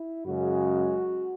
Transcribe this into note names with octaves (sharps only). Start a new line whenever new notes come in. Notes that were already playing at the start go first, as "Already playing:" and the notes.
Already playing: E4
F#2 C#3 G#3 F#4